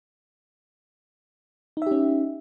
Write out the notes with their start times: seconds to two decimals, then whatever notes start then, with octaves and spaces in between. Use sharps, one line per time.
1.77 D#4
1.82 E5
1.87 G4
1.91 C#4